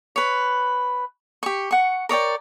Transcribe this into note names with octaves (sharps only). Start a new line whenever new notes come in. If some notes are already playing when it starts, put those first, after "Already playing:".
B4 C#5
G4 C#6
F#5 C#6
A#4 C#5 D5 G5